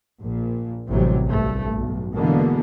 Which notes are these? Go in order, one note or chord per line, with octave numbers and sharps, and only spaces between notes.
A#1 A#2
A1 C3 E3 F#3 G3
C2 G2 A3
B1
B2 D3 E3 G#3 A#3 B3